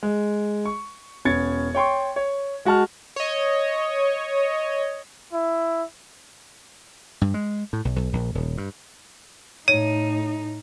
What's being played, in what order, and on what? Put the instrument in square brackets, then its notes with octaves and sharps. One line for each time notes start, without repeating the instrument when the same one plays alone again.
[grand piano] G#3
C#6
E1 B3 C#4 G#6 A6 C#7
C#5 G5 C6 C#6
C#5
G#3 F#4 F#5 A5 F6
[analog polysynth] C#5 D#5
[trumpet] E4
[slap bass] G2
G#3
A2
B1
B1
A#1
D#1
G2
[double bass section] A2 [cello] D#4 [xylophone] C#5 [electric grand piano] D#7